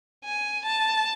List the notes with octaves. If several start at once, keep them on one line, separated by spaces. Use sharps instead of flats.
G#5
A5